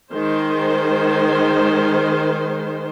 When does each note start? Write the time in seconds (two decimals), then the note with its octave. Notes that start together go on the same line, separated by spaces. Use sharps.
0.12 D#3 G#3 C5